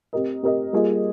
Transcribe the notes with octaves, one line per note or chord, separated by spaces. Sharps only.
C4 G4 A#4 D#5
C4 G4 A#4 D#5
G3 A#3 F4 G#4 D#5